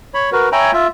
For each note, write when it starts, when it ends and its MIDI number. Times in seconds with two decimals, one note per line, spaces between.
0.14 0.30 73
0.14 0.30 83
0.32 0.49 66
0.32 0.49 70
0.32 0.49 71
0.52 0.71 73
0.52 0.71 76
0.52 0.71 79
0.52 0.71 80
0.52 0.71 82
0.52 0.71 83
0.73 0.87 65
0.73 0.87 76